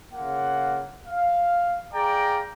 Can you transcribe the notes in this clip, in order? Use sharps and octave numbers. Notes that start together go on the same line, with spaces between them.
C#3 A#3 F4 F#5
F5
G#4 D5 F5 G5 A#5